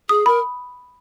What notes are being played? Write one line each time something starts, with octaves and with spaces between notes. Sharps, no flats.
G#4 D#6
A#4 B5